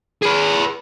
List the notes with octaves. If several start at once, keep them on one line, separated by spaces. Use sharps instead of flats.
G#4 B4